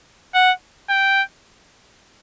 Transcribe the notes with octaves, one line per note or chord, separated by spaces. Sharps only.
F#5
G5